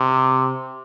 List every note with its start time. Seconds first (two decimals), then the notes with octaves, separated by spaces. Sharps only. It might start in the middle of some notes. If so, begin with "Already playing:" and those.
Already playing: C3